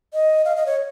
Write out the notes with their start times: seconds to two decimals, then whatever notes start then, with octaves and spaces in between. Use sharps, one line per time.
0.14 D#5
0.45 F5
0.56 D#5
0.66 C#5